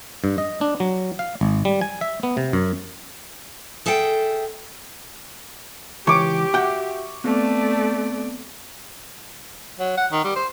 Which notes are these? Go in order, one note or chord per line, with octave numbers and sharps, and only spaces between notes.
G2
D#5
D4
F#3
F5
G#1
G3
G#5
E5
B3
C3
F#2
G#4 A4 E5 F#5 G5
C#2 E3 G4 C#6 D6
F#4 E5 F#5 G5
A3 B3 C4 D5
F#3
F#5
D#3
G3
C5